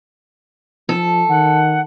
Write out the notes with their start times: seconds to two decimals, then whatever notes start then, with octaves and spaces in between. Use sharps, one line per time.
0.89 F3 A4
1.29 D#3 F#5